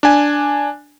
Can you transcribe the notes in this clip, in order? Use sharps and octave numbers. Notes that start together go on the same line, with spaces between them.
D4 G#5